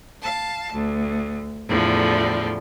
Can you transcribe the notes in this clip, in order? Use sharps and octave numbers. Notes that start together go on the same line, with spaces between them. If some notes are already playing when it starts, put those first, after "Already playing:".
F5 A5
D2
E2 A2 D3 F3 G3